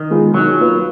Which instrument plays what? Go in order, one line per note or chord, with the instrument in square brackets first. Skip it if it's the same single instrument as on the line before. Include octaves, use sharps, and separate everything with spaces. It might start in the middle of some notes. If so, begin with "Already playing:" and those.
Already playing: [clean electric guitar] D#3
[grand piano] G#3 B3 F4
[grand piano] D#3 [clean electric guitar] F#3
[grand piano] A#3 F4 B4